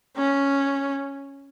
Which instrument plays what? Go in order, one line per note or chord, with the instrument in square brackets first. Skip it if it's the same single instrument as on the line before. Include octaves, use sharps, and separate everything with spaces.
[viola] C#4